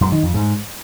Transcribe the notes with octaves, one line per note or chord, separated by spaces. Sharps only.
F#2
D#3
F2
G#2